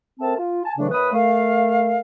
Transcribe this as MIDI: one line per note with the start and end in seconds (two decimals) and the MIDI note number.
0.20 0.34 57
0.20 0.34 60
0.20 0.34 70
0.20 0.34 72
0.20 0.34 81
0.37 0.60 65
0.65 0.73 80
0.65 0.73 81
0.78 0.88 45
0.78 0.88 49
0.78 0.88 52
0.78 0.88 54
0.78 0.88 57
0.78 0.88 62
0.91 1.11 42
0.91 1.11 71
0.91 1.11 83
0.91 1.11 87
1.13 2.00 57
1.13 2.00 70
1.13 2.00 77